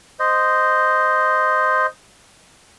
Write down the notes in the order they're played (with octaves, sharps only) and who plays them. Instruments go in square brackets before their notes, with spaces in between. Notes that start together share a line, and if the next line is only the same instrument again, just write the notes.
[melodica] C5 D#5